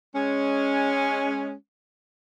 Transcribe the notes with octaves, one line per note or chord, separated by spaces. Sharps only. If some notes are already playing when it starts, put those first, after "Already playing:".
G#3 C#4